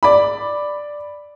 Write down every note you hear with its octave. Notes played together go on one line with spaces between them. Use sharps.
D5 B5